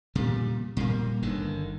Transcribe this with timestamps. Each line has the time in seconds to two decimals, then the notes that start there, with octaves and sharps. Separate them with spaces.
0.15 A#2 C#3 G3
0.77 A#2 G3 A#3
1.22 G1 D3 D#3